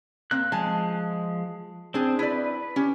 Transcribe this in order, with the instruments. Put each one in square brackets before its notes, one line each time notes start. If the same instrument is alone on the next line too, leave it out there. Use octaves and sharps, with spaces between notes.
[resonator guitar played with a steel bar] A#3 C4 [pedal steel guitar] F#6
[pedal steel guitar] F3 G#3 [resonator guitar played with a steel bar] G#5 A5
[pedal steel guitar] C4 [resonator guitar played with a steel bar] D4 G#4
[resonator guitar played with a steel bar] E4 D5 [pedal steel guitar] B4
[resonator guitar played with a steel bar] C#4 G4